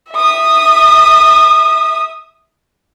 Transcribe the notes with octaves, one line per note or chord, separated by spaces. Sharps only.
E5 D#6